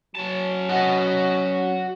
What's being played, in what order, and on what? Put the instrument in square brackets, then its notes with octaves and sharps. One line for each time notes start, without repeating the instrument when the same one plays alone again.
[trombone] F#3 [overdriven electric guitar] C#4 A5
[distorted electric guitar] F#4 D#5